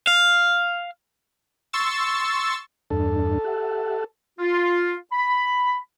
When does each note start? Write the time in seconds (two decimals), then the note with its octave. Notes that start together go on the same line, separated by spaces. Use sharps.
0.07 F5
1.73 C6 C#6 E6 A6
2.90 E2 G2 D4 A4
3.44 G4 E5 F#5
4.39 F4
5.13 B5